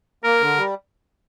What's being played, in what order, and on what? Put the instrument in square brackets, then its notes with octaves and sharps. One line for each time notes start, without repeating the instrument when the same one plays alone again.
[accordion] A#3 [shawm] A#4
[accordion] D3
G3